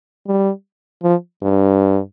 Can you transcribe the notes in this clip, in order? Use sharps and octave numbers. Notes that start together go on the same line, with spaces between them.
G3
F3
G2